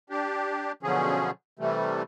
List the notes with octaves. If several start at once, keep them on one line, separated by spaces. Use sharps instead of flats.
D4 G4
B2 D3 F3 F#3 C#4 G#4
C3 E3 G3 A3